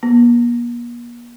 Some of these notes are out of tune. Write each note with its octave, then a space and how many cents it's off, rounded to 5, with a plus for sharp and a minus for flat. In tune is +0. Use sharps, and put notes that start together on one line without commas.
A#3 +45